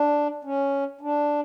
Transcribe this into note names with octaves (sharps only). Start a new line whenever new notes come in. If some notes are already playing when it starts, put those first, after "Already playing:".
Already playing: D4
C#4
D4